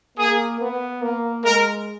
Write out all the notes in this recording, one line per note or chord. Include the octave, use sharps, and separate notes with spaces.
A#3 G#4
B3
A#3
G#3 A#4